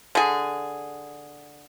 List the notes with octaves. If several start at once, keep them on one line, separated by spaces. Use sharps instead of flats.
D3 G#4